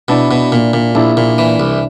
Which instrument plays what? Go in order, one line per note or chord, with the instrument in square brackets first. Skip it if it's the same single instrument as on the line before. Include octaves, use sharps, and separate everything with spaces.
[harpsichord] B2 [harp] D4 E4
[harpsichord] B2
A#2
A#2
[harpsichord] A#1 [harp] D4 E4
[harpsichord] A#2
E3
C2